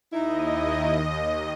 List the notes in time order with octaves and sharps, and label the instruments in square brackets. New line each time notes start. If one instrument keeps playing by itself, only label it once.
[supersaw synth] D#2 D#5 [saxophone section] D#4 E4